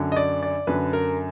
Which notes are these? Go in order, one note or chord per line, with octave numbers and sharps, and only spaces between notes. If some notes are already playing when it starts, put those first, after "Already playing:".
Already playing: F#2 D3
D#5
D5
D5
F#2 D3 B4
A#4